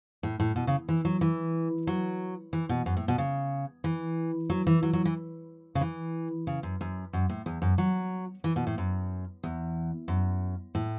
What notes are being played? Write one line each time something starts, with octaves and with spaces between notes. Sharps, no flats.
A2
A2
B2
C#3
E3
F#3
E3
F#3
E3
B2
F#2
A2
B2
C#3
E3
F#3
E3
F#3
F#3
E3
C#3
E3
C#3
F#2
F#2
F#2
A2
E2
F#2
F#3
E3
B2
A2
F#2
E2
F#2
A2